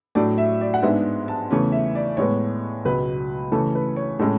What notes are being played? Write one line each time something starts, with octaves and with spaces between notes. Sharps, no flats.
A2 F#3 A3 D4 D5
E5
D5
F#5
G#2 G#3 B3 D4 E5
A5
E2 C#3 E3 A3 C#4
E5
D5
A2 G#3 B3 C#5
C#2 B2 F#3 B3 B4
C#3 E3 A3 C#4 A4
B4
C#5
A2 G#3 C#4 A4